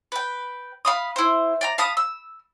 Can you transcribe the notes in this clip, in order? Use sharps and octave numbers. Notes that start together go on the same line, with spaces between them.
B4 G5
F5 B5 D#6
E4 C5
D5 G5 A#5
F5 A5 B5 D#6
E6